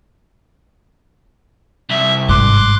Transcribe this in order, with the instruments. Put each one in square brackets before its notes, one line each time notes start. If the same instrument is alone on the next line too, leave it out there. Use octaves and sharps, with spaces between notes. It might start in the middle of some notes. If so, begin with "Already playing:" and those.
[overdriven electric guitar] C2 [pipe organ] E5
[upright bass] G#1 G2 [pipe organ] C6 D6 F#6